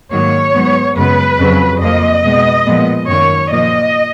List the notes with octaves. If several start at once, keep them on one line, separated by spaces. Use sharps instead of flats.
G#2 D#3 F#3 A#3 C#5
G#2 F#3 B3
F#2 C#3 G#3 B3 B4
F2 C#3 F#3
F2 F3 A#3 D#5
B2 G#3 B3
A#2 F3 G#3 B3
F#2 D#3 A#3 C#5
A#2 F3 A#3 D#5